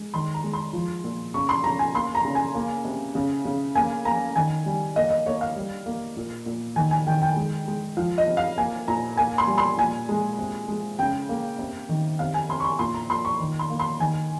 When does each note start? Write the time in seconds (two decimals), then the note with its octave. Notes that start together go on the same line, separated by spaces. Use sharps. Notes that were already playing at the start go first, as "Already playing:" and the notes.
Already playing: G#3
0.14 D#3 C6
0.34 A#5
0.44 G#3
0.53 C6
0.73 F3
1.04 A#2
1.34 C#3 C#6
1.49 C6
1.64 C#3 A#5
1.79 G#5
1.94 A#3 C6
2.15 A#5
2.25 C#3
2.35 G#5
2.55 A#3
2.85 C3
3.15 C#3
3.45 C#3
3.75 A#3 G#5
4.05 A#3 A#5
4.36 D#3 G#5
4.66 G3
4.96 A#3 D#5
5.10 D#5
5.26 A#3 C#5
5.41 F5
5.56 G3
5.86 A#3
6.17 A#2
6.46 A#2
6.76 D#3 G#5
6.91 G#5
7.07 D#3 G5
7.22 G5
7.36 G#3
7.68 G#3
7.97 F3 F5
8.18 D#5
8.27 C3
8.37 F5
8.58 A#3 G#5
8.88 A#2 A#5
9.17 A#3 G#5
9.38 C6
9.47 G3
9.58 C6
9.78 A#2 G#5
10.09 G#3
10.38 C3
10.68 G#3
10.99 C#3 G5
11.29 A#3
11.59 C3
11.89 D#3
12.19 C3 F5
12.34 G#5
12.49 C3 C6
12.60 C#6
12.64 C6
12.79 A#2 C6
12.94 A#5
13.10 A#2 C6
13.25 C#6
13.40 D#3
13.59 C6
13.70 A#3
13.80 C6
14.00 D#3 G#5